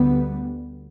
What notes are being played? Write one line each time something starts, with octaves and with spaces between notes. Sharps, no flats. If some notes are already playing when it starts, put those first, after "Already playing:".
Already playing: D2 D3 G3 B3